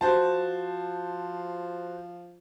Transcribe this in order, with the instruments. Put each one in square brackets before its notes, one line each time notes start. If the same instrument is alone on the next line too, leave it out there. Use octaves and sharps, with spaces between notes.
[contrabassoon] F3 [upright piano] F#4 C5 A5